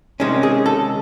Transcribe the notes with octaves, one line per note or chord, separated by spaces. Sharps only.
C3 D#3 G#3 C#4
G#4
A4